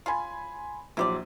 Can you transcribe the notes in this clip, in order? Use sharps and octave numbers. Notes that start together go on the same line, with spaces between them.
C#4 F4 G#5 B5 C6
A#1 F#3 E4 G4 C5 D5